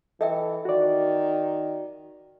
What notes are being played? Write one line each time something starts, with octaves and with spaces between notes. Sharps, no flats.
E3 A4 D#5 E5 G5
D#3 F#4 D5